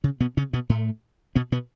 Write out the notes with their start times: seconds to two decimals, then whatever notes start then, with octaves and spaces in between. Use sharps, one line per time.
0.04 C#3 C#4
0.20 B2 B3
0.37 C#3 C#4
0.53 B2 B3
0.69 A2 A3
1.35 B2 B3
1.52 B2 B3